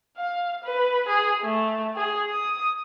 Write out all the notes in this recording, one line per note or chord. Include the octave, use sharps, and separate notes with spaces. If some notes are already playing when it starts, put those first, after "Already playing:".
F5
B4
G#4
A3
G#4
D#6